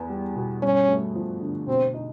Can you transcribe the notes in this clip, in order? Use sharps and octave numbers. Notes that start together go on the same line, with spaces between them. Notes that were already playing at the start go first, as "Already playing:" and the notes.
Already playing: E2 B3
G3
B2
G2 C#4
A3
F3
D3
B2 C4
D#4